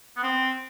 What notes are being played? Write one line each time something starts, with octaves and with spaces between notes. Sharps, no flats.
B3
C4